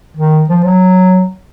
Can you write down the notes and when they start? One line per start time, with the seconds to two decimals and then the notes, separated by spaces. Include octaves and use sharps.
0.17 D#3
0.50 F3
0.64 F#3